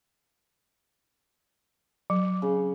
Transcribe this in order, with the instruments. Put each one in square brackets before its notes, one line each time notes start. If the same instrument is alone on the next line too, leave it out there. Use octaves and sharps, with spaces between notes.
[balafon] F#3
[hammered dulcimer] C#3